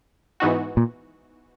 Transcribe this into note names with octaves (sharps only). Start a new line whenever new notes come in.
G#2 E3 B3 D#4 F#4
A#2